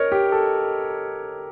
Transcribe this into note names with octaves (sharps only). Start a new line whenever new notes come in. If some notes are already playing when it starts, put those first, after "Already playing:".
Already playing: A#4 C#5 D#5
G4
A4